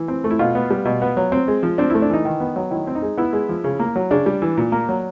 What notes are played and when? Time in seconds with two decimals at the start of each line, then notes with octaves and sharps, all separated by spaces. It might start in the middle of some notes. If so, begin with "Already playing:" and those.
Already playing: E3
0.08 C4
0.24 A3
0.31 E4
0.39 B2 F4
0.55 B3
0.70 G3
0.85 B2
1.02 B3
1.17 F#3
1.32 C4
1.48 G#3
1.63 F3
1.78 C4 D4
1.90 A3 E4
2.02 D4
2.10 E3 D#4
2.25 D#3
2.40 B3
2.56 F#3
2.71 D#3 E4
2.87 C4
2.95 D#4
3.02 G#3
3.17 B3 E4
3.33 G#3
3.49 F3
3.64 C#3
3.79 A#3
3.96 F#3
4.11 C#3 D4
4.26 G3
4.42 E3
4.57 A#2
4.72 A#3
4.89 F#3